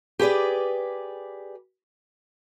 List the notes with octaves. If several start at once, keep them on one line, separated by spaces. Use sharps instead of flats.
G4 G#4 B4 D5